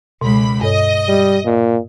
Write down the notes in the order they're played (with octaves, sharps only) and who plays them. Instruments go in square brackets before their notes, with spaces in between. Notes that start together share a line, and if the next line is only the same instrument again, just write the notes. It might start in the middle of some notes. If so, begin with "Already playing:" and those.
[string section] C#2 B5 [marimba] B2
[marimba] G2 A4 C#5 [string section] D#5
[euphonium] G3
A#2